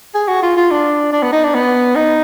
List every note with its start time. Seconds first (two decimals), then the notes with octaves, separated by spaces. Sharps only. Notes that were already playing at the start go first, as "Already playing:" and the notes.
0.14 G#4
0.28 F#4
0.42 F4
0.57 F4
0.71 D4
1.13 D4
1.23 B3
1.32 D#4
1.44 D4
1.55 B3
1.96 D#4